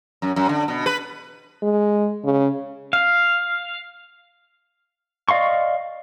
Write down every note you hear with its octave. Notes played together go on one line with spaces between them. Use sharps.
F#2
F#2
D3
B2
B4
G#3
C#3
F5
D5 D#5 F5 C6 C#6